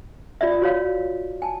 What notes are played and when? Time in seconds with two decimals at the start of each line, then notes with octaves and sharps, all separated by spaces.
0.41 F4 D5 E5
0.62 F#4 C#5 F5
1.42 G#5 A5